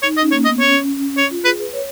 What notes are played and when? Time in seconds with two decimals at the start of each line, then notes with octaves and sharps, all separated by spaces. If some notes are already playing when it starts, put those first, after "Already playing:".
0.02 D#4 C#5
0.13 D#4 D#5
0.22 C#4
0.31 A#3 C#5
0.45 B3 D#5
0.60 C#4 C#5
1.17 C#5
1.31 F4
1.45 G#4 B4
1.60 B4
1.73 C#5